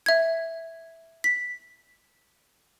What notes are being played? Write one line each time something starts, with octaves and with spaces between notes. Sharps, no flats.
E5 G#6
B6